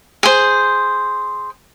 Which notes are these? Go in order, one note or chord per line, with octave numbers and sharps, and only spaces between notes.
G#4 C5